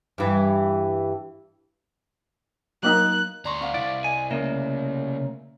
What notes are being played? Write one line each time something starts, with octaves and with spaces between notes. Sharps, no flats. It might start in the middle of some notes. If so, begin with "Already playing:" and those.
G2 E3
F#3 A#3 D#4 F#6
D2 D5 A#5 C6 C#6
C4 F5 F#5
C3 E4 D5
D#5 G#5
C#3 A3 A#3 E5